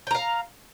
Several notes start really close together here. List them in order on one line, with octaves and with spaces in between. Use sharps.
G5 A#5 F5